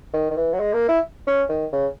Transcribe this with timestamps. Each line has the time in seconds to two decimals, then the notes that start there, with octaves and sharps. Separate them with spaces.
0.13 D#3
0.30 D#3
0.36 E3
0.53 F#3
0.59 G#3
0.73 A#3
0.88 E4
1.27 C#4
1.49 D#3
1.72 C#3